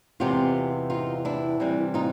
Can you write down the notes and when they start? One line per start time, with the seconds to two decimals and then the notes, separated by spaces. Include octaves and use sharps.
0.20 E2 C3 E3 G#3 F4 G4
0.90 D#4 F4
1.25 D4 E4
1.60 C3 E3 G3 C4
1.94 D#4 F4